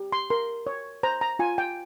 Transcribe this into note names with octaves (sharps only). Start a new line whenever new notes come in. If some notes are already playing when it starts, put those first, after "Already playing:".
Already playing: G4
C6
A#4 C6
C#5
C5 A#5
A#5
F4 G#5
G5